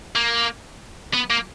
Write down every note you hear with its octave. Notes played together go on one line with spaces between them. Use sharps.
A#3
B3
A#3